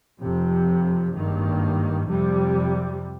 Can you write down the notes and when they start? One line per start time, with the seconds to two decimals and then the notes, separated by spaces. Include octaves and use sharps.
0.21 F1 F2 C3
1.14 G#1 G2 D#3 A#3
2.06 F2 C3 G3